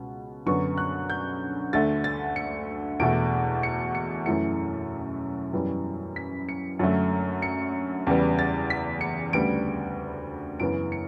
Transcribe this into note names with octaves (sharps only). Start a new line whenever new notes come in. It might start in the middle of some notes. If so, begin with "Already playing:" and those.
Already playing: C#2 B2
F#2 D3 F#3 B3 C#6
F#6
G6
D2 D3 A3 A6
A6
C#7
E2 B2 A3 D7
C#7
C#7
F#2 E3 A3 C#7
F#2 E3 G3 B3
B6
C#7
F#2 D3 F#3 A3
C#7
E2 C#3 G3 B3
A6
B6
C#7
D2 C#3 G3 B3 D7
F#2 C#3 E3 B3 D7
C#7